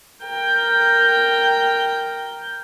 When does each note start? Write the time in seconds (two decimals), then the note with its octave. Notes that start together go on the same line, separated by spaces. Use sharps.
0.25 A#4 G5